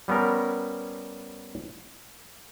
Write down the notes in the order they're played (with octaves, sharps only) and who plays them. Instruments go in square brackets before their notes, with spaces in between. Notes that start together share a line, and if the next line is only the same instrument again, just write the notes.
[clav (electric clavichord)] G3 B3 C#4 A#4